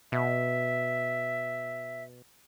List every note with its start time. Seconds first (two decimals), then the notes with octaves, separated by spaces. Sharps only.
0.12 B2 E5